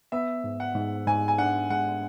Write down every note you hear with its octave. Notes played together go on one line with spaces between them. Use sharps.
B3 E5
G#2
F#5
G#2
G#2 G#5
G#5
D4 F#5
G#3 F#5